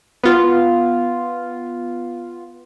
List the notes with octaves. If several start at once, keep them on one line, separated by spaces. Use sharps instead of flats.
B3 F4